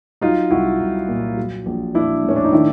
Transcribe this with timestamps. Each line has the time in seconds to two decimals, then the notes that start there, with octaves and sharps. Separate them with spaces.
0.21 F#3 D#4 F4
0.51 C2 E4 F#4
0.80 C2
1.08 A#2
1.37 F#3
1.66 A#1
1.95 A#1 D4 E4
2.24 A2 C#4
2.36 D4
2.44 D#4
2.52 D#3 D4 E4